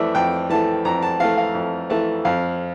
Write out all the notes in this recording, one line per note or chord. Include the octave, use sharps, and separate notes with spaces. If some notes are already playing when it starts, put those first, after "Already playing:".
Already playing: F2 E3 A3 D5 E5
F2 G5
E3 A3 A5
F2 A#5
A5
E3 A3 F5
F5
F2
E3 A3 A5
F2 F5